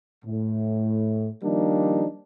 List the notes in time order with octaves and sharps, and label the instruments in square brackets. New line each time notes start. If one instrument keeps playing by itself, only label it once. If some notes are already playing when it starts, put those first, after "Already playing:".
[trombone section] A2
D#3 F3 G3 A#3 D4 D#4